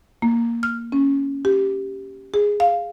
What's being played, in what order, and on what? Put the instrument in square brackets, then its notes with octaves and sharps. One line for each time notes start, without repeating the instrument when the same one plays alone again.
[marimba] A#3
F6
C#4
G4
G#4
F5